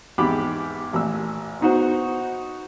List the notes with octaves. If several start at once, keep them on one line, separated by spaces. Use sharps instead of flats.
E2 G#2 G4 B5 D6
A1 A#2 E6
B2 D#4 F#4 C5